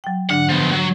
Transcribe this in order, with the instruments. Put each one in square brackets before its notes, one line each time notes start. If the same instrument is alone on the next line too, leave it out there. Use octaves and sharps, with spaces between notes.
[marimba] F#3 G5
[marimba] G#2 D3 D4 [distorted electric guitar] F#5
[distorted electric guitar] F3 B3
F#3